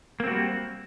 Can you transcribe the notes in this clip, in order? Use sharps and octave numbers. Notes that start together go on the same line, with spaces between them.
G3 A#3 C4 F#4